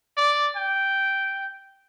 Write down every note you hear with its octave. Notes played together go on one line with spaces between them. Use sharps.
D5
G5